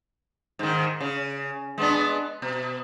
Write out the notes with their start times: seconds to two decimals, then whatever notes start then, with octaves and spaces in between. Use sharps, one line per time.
0.59 G#2 D#3
1.00 C#3
1.78 G#3 B3 D4
2.42 B2